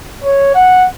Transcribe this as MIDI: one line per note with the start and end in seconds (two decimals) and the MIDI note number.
0.24 0.50 73
0.55 0.87 78